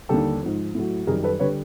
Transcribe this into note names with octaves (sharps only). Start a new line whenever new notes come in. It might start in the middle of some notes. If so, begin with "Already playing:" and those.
D#2 D3 G3 G4 A4
G#2 F3
A2 F#3
F#2 D#3 G3 G#4 A#4
A4 B4
D3 G3 B4 C#5